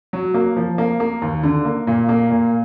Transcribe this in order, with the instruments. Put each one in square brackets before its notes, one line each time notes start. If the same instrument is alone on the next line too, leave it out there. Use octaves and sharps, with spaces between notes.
[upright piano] F#3
A#3
F3
A#3
A#3
D#2
D3
A#3
A#2
A#3
A#2